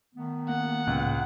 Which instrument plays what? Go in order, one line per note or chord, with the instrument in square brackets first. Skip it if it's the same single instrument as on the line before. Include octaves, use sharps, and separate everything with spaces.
[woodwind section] D#3 A3 B3
[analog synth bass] A#3 [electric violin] F#5
[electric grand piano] C#2 [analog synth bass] A2